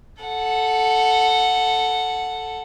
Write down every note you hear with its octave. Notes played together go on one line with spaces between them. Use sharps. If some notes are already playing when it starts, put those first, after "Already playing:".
A4 F#5